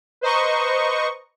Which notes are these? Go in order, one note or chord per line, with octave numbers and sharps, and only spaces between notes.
B4 C5 D#5 A#5 C#6